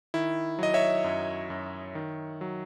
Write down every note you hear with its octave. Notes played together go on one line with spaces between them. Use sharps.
D#3 E4
F#3 D#5
C#5 E5
F#2
F#2
D#3
F#3